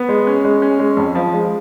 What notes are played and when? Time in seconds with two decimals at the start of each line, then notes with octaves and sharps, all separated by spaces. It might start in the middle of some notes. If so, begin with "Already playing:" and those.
Already playing: B3
0.09 G#3
0.27 C#4
0.44 G#3
0.62 C#4
0.79 G#3
0.97 F2
1.15 F3
1.33 G#3